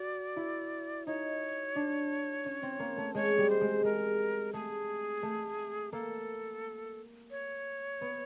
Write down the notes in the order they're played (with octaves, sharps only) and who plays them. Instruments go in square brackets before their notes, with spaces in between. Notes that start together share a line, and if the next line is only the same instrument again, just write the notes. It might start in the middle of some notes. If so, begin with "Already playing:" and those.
Already playing: [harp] F#4 [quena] D5
[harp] E4
[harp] D#4 [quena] C#5
[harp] D4
C#4
C4
A#3
A3
[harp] G#3 [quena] C#5
[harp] G3
[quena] C5
[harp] G#3
[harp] G#3 [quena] A#4
[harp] A3 [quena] G#4
[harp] A3
[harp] A#3 [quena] A4
[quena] C#5
[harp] B3